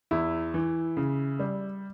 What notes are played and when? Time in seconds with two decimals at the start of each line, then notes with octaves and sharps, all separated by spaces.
0.11 E2 E4
0.54 E3
0.97 C#3
1.39 G3